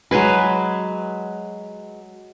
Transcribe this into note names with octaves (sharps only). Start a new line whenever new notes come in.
F#3 G#3 G#4 B4